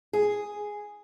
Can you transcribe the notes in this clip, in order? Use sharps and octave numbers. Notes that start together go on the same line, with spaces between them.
G#4